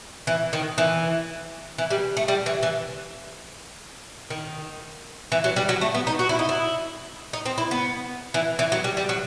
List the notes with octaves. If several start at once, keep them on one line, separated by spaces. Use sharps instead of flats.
E3
D#3
E3
E3
G3
A3
G3
E3
E3
D#3
E3
F#3
G3
F#3
A3
B3
D#4
F#4
E4
D#4
E4
D#4
C4
E4
B3
E3
E3
F#3
G3
G3
F#3